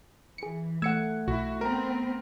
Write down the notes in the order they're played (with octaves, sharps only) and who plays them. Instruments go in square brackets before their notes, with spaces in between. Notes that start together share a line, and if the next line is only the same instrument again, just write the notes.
[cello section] E3 [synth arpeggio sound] G#4 C#7
[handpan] A3 F#5 [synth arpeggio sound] E6 [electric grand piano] G#6 C#7
[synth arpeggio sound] B1 [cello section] E4 [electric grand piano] F#4
[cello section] B3 C4 [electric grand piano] A#4 A#5